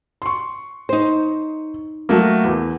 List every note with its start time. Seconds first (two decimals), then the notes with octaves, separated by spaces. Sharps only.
0.22 C6 C#6
0.89 D#4 C5
2.09 F#3 A3 A#3
2.44 E2